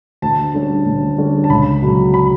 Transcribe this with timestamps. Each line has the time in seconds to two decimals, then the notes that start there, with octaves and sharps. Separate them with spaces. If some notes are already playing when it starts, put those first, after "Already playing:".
0.22 D2 A5
0.54 D3 G3 C#4
0.86 D2
1.18 D3 G3 C#4
1.44 A5
1.50 C#2 B5
1.82 B2 F#3
2.14 B5